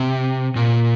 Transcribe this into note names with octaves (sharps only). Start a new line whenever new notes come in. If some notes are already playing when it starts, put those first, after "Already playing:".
Already playing: C3
A#2